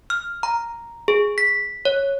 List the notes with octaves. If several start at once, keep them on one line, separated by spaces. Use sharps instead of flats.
F6
A#5
G#4
B6
C#5